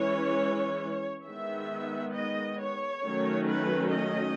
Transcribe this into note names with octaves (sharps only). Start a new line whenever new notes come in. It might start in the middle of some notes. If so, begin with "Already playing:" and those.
Already playing: E3 G#3 C#4 C#5
D#3 G#3 B3 E5
D#5
C#5
D#3 F#3 A3 C#4
B4
D#5